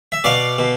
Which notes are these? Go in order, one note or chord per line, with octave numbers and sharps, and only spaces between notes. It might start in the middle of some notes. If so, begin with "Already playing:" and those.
E5
B2 D5 F5
B2